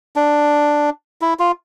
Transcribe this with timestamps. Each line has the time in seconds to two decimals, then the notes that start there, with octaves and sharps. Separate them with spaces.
0.16 D4
1.21 E4
1.39 F4